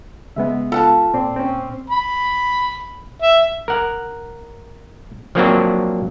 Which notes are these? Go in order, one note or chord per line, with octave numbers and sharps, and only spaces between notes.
C#3 G#3 B3 E5
F4 A4 F5 F#5 A5 B5
A#2 C4 D5 C6
C4 C#4
B5
E5
A#4 F#5
F3 F#3 A#3 C4 D4 F#4